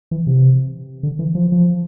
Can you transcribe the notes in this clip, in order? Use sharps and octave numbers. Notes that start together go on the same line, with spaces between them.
E3
C3
D3
E3
F3
F3